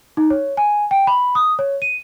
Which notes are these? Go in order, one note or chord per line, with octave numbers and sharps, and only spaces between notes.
D#4
C#5
G#5
G5
B5
D#6
C#5
D#7